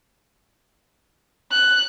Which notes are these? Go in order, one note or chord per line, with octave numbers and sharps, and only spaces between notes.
F#6